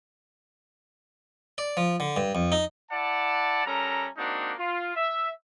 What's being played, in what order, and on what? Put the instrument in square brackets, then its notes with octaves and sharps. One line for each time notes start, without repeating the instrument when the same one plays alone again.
[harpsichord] D5
F3
D3
G2
F2
D#4
[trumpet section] E4 D5 F#5 A5
G3 C#4 A4 A#4 A#5
G#3 A#3 C4 D4 D#4 F#4
F4
E5